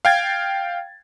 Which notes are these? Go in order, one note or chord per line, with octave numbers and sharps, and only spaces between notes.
F5 G5 G#6 A6